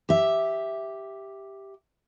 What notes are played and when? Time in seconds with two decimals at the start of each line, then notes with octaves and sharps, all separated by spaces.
0.09 G4 E5